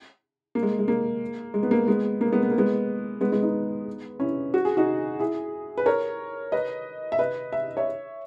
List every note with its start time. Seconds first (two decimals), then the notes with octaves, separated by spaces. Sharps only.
0.55 A#3
0.63 G#3
0.79 G#3
0.88 A#3
1.54 G#3
1.63 B3
1.71 A#3
1.88 G#3 B3
2.21 A#3
2.32 G#3 B3
2.43 B3
2.50 A#3
2.58 G#3 B3
3.21 G#3 B3
3.32 G#3 B3
3.43 B3 D#4
4.20 C#4 E4
4.54 F#4
4.65 G#4
4.77 D#4 F#4
5.19 E4 G#4
5.78 B4
5.86 A#4 C#5
6.52 B4 D#5
7.12 E5
7.19 B4 D#5
7.53 E5
7.77 C#5 E5